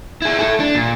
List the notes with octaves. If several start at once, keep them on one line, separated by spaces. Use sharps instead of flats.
E4 G#4
E4 A4
D4
A#2